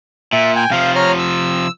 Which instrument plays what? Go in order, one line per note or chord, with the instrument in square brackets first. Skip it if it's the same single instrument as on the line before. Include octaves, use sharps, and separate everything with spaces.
[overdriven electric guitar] A#2 [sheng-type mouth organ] E5
[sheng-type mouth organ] G5 G#5
[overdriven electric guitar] C3 F3 [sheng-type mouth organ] F5
[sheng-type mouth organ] C#5 A#5 F6
E6